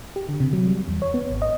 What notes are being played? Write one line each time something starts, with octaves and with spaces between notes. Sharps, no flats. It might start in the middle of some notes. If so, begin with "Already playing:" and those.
G4
D3
C3
F#3
G3
E2
C#5
B3
G#1
D#5